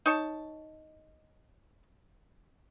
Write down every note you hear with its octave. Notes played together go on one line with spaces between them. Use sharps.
D#4 C#5 A5